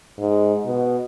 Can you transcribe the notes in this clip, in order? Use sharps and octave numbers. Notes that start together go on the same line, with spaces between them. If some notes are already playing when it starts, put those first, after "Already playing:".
G#2
B2